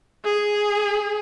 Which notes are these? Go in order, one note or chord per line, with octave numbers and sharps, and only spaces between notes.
G#4